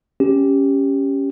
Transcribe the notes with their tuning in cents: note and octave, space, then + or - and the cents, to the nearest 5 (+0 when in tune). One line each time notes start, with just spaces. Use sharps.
C#4 +0 G4 +0